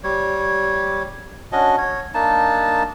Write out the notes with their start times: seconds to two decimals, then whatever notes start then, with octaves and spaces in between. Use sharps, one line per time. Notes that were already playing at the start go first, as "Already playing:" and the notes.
0.04 G3 C#5
1.52 C#4 D4 F#4 D#5
1.78 C#5
2.14 A#3 D4 D#4 A5